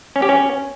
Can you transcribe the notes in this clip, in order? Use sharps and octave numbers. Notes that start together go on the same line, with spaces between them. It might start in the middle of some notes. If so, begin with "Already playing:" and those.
C#4
G4
C#4